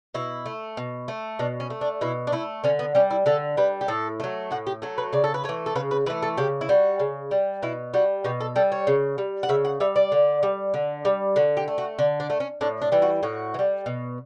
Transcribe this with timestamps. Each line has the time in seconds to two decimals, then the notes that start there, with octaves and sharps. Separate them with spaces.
0.14 B2 E4
0.46 A3
0.77 B2
1.08 A3
1.39 B2 D4
1.60 C#4
1.70 A3
1.81 D4
2.01 B2 E4
2.27 D4
2.32 A3 E4
2.64 D3 C#4
2.79 B3
2.95 G3 C#4
3.11 E4
3.26 D3 A4
3.57 G3 B4
3.81 G4
3.88 A2 A4
4.20 F#3 A3
4.51 A2 F#4
4.67 G4
4.82 F#3 A3
4.98 B4
5.13 C#3 D5
5.24 A4
5.34 B4
5.44 A3 C#5
5.49 E3
5.66 A4
5.75 C#3 B4
5.91 B4
6.06 E3 B4
6.10 A3
6.22 A4
6.37 C#3 G4
6.61 E4
6.69 G3 F#4
7.00 C#3
7.31 G3
7.63 B2 E4
7.94 G3 F#4
8.24 B2 G4
8.40 A4
8.56 G3 A4
8.72 C#5
8.87 C#3
9.18 G3
9.43 F#5
9.49 C#3 E5
9.65 F#5
9.80 G3 E5
9.96 D5
10.12 D3
10.43 G3
10.74 D3
11.05 G3
11.36 D3 F#4
11.57 G4
11.68 A3
11.78 F#4
11.99 D3 D4
12.20 D4
12.30 A3
12.40 C#4
12.61 A2 D4
12.82 D4
12.92 E3 G3
13.02 F#4
13.23 A2 F#4
13.54 E3
13.59 G3
13.86 B2